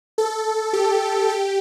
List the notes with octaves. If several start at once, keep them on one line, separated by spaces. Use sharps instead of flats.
A4
G4
G4